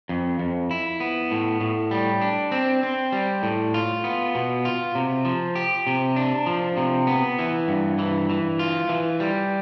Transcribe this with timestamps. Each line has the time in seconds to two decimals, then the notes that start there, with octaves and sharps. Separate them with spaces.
0.09 F2
0.39 F2
0.71 E4
1.00 B3
1.31 A2
1.61 A2
1.91 G3
2.22 D4
2.52 C4
2.83 C4
3.12 G3
3.43 A2
3.74 F4
4.04 B3
4.35 B2
4.65 F4
4.95 C3
5.25 F3
5.56 G4
5.87 C3
6.16 D4
6.47 F3
6.77 C3
7.07 B3
7.39 E3
7.68 G2
7.99 E3
8.30 E3
8.59 F4
8.89 E3
9.20 G3